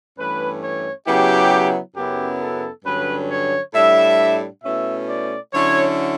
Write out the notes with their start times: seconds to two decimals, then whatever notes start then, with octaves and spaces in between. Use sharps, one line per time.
0.17 G2 E3 A3 C#4 B4
0.62 C#5
1.06 C#3 F#3 B3 E4 G4
1.96 F#2 C#3 F#3 B3 E4 G4
2.40 A4
2.85 G2 D3 F#3 C#4 B4
3.29 C#5
3.74 A2 G3 D4 E5
4.63 B2 A3 C#4 E4 E5
5.09 D5
5.53 D3 F#3 C#4 E4 C#5